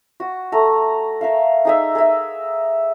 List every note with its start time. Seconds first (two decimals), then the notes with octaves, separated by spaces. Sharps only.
0.20 F#4
0.52 A3 A#5
1.21 A#4 E5 F5
1.65 D#4 G#4 E5
1.95 G#4 A#4 E5